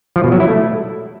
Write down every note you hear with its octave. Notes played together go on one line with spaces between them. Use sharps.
F3
B2
F#3
E4
A3